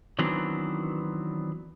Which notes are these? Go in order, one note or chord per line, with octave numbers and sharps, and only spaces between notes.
D#3 E3 F#3 B3 C4 D4